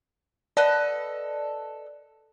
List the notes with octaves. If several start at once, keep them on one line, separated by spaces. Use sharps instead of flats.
A4 B4 D5 D#5